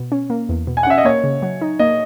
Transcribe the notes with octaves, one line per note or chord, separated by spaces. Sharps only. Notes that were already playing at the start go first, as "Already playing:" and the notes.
Already playing: B2
C#4
A#3
E2
B2
G#5
F#5
C#4 E5
D#5
A#3 C#5
C#3
F#3
D#4
A#3 D#5